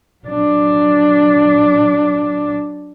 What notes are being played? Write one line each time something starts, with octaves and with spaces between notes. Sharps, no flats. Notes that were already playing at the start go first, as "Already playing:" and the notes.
F#3 D4